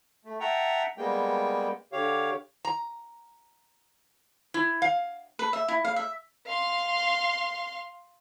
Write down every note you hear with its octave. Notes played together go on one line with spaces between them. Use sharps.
A3
E5 F#5 G5 A5 A#5
G3 G#3 A#3 B3 G5
D3 G4 C#5 F5
A#5
E4
F5
B4
E5
E4
F5
E5
F5 C6